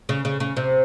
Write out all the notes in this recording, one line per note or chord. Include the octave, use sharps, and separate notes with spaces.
C#3
C#3
C#3
C3